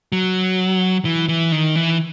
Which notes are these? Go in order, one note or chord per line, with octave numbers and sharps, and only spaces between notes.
F#3
E3
E3
D#3
E3